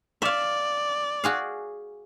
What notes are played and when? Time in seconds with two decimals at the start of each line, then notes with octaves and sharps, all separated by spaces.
0.22 D5 E5 F5
1.24 F#4 G#4 F5